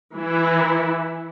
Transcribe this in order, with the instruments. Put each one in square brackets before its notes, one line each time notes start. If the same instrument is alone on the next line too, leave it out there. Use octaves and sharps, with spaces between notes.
[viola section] E3 E4